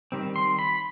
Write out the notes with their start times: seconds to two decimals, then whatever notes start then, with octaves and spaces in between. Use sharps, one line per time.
0.12 D#3 G3 C4
0.36 C6
0.59 B5